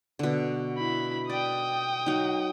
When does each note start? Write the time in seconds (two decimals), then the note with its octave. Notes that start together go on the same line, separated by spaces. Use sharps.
0.19 B2 D3
0.78 E4 B5
1.30 D5 G5 D#6
2.06 F#3 D#4